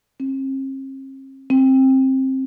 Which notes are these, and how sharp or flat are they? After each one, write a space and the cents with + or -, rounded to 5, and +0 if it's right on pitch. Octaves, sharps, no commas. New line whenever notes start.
C4 +45
C4 +20